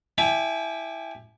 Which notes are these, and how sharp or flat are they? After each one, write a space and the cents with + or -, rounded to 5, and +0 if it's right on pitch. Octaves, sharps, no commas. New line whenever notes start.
E4 +0 G4 +20 G#5 +40